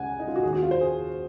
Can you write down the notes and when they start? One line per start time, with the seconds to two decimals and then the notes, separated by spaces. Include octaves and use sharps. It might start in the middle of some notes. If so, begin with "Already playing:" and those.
Already playing: C#2 C#3 F#5 G#5
0.19 D#4
0.28 F4
0.36 F#4
0.43 D#2 D#3 G#4
0.53 F#4
0.62 F4
0.71 C5
0.81 G#4